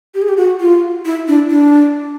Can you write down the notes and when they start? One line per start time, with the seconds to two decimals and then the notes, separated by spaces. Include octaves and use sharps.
0.14 G4
0.22 G#4
0.28 G4
0.37 F#4
0.60 F4
1.05 E4
1.28 D4
1.50 D4